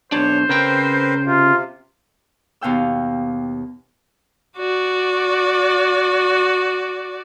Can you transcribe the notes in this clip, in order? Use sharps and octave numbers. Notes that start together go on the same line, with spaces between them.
B1 D4 C5 C#5
C#3 C4 A#4 B4 G5
C3 F4
D#2 B2 F5 G5 E6
F#4 D5